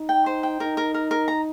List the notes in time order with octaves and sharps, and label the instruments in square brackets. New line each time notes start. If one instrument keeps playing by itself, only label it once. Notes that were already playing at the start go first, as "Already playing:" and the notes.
Already playing: [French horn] D#4
[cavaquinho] G5
C5
G5
[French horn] D#4 [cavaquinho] A#4
[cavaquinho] A#4
A#4
A#4
A#5